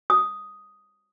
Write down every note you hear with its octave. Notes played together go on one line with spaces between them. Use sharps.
D#6